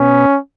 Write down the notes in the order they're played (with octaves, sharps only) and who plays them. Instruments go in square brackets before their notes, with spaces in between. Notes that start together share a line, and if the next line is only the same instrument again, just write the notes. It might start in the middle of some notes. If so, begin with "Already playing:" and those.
Already playing: [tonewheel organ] B2 B3 [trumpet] C#4